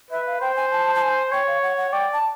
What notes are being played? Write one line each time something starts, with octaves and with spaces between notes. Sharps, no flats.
B4 E5
F5
C5 G5
G#5
A5
A5
G#5
C#5 G5
F5
F#5
F#5
D5 G5
A5